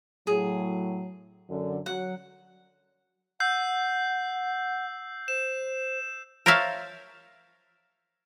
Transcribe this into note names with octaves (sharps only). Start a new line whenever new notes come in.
A2 F#3 G#4
F#2 D3
F#3 F#5
F#5 E6 G6 C7
C5 E7
A#4 C5 C#5 E5 F5 A5